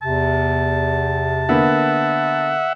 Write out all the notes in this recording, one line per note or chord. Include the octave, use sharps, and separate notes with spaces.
E2 C3 A5
D3 A#3 B3 E5 F#5